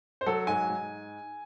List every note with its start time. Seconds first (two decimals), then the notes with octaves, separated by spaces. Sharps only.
0.21 C5
0.26 F#3 A4
0.47 G#2 G#5
0.69 G#2